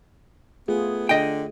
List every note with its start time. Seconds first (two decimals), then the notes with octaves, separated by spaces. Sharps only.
0.68 A3 B3 F4 G#4
1.09 D3 D#5 G5